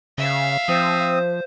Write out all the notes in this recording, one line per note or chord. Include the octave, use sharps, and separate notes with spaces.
C#3 E5 F5
F3 C4 C5 D#6